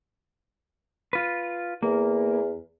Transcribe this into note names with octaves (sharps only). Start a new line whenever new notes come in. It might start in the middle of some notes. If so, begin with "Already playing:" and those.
F4 B4
E2 A#3